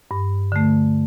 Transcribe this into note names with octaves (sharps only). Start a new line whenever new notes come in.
G2
D3 A3